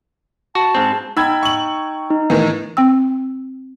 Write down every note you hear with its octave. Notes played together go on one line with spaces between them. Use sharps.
F#4 A5
G#2 C4
D#4 G5 B5 E6 G#6
C#6 F#7
D#4
A2 D#3 E3
C4 G5 E6